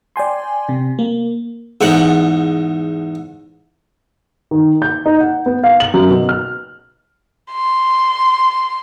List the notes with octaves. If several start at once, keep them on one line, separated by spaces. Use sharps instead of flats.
D5 G5 G#5 C6
C3
A#3
E2 G#2 F#5
D#3
G6
D#4
F#5
B3
F5
F#7
F#2
B2
F6
C6